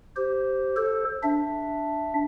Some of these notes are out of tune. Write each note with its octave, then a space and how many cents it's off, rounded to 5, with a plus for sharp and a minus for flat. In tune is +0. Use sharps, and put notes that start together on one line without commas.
G4 -15 C5 +0
A4 +0 C5 +25
D4 +0 E5 +0